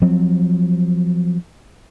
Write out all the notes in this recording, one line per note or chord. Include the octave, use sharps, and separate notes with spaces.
F3 F#3 C4